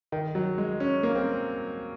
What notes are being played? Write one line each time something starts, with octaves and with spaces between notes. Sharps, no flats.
D#3
F#3
G#3
C#4
A#3
C4